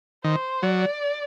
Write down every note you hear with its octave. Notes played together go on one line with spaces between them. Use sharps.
D#3 C5
F#3 D5